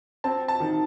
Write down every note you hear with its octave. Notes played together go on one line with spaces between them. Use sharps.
C4 A5
A5
D#3